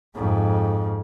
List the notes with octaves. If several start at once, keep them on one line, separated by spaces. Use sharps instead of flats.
F2 G#2